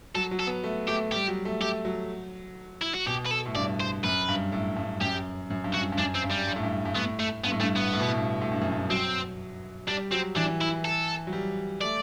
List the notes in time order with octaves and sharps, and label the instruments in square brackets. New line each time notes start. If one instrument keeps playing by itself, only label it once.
[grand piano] F#3 [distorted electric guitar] A4
[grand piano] F#3
[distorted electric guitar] A4
[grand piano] B3
A3
[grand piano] A3 [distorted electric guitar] G4
[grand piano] G3 [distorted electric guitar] G4
[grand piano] F#3
A3
[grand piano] A3 [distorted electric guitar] G4
[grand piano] F#3
[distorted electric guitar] E4
F#4
[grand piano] B2 [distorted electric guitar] G4
[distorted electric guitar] B4
A4
[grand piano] A2
[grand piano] G2 [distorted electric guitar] D5
[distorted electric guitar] C5
[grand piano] F#2 [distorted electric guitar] B4
[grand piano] G2
A2
G2
[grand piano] F#2 [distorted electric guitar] G4
[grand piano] F#2
G2
[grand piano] F#2 [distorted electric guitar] F#4
[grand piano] G2
[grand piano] F#2 [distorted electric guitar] D4
[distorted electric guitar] C4
[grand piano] G2
[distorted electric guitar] G3
[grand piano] G2
A2
G2
G2
[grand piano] A2 [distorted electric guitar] B3
[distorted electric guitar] A3
[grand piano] G2 [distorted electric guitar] B3
[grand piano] A2
[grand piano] G2 [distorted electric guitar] A3
[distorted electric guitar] B3
[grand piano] A2
B2
A2
G2
A2
G2
F#2
G2
[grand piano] F#3 [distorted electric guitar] C4
[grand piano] G3 [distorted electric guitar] D4
[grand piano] F#3 [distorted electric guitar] C4
[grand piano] E3 [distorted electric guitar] D4
[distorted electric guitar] E4
A4
[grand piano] F#3
G3
[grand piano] A3 [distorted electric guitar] D5